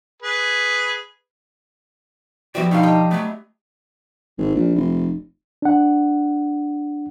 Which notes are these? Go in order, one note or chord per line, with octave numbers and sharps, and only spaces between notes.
G#4 B4
F3 G3 B3 E4 F#4 D5
B2 D3 D#4 F5
G4 D#5
F#3 A3 B3
G#1
A#1
F1
D4 F#5